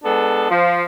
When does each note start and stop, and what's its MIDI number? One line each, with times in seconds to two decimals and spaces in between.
0.04 0.49 56
0.04 0.49 59
0.04 0.49 62
0.04 0.49 69
0.50 0.83 53